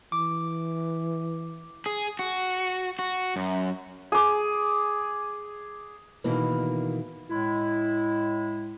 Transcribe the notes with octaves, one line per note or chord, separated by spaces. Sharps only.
E3 D6
G#4
F#4
F#4
F#2
G#4 D6
B2 D#3 E3 A#3
A2 G#3 E4